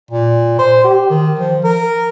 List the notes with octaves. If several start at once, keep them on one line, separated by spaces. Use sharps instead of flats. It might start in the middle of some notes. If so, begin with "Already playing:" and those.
A#2
C5
G4
D#3
F3
A#4